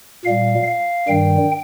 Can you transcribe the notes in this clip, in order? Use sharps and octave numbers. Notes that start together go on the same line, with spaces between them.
A#2 G3 F5
F5
G2 D#3 G3 G5